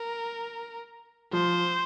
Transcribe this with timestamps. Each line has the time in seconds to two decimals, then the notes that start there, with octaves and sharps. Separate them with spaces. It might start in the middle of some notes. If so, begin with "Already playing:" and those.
Already playing: A#4
1.33 F3 C5